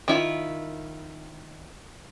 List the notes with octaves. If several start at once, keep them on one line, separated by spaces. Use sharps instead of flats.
D#3 E4 F4